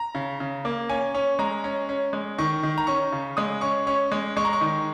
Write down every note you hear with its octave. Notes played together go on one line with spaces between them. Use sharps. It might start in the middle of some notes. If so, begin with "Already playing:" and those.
Already playing: A#5
C#3
C#3
A#3
C#4 G#5
C#4
G#3 A#5
C#4
C#4
G#3
D#3 C#6
D#3
A#5
C#4 C#6
C#3
G#3 D#6
C#4 C#6
C#4 C#6
G#3
G#3 C#6
A#5
C#6
D#3